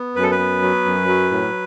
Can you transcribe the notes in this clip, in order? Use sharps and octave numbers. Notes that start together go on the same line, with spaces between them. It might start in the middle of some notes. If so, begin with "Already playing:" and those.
Already playing: B3
F#2 B4
A4
B4
B3
F#3
F#2
F#3
A2